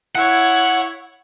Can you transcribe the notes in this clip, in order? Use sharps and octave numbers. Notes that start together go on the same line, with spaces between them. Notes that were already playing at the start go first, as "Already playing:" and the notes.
E4 C#5 F#5